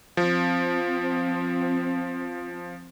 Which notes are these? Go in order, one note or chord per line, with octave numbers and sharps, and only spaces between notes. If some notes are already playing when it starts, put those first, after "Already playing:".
F3 C4